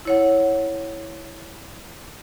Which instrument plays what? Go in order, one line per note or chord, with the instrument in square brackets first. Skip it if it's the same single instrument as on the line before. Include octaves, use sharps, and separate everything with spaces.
[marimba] E4 C#5 F#5